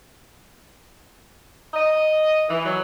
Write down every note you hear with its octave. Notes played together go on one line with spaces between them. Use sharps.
D#5
E3
F#3